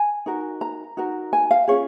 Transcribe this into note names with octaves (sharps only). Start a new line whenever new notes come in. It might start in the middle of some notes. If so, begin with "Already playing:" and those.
Already playing: G#5
D#4 F#4 A#4
A#5
D#4 F#4 A#4
G#5
F5
C#4 F4 G#4 C#5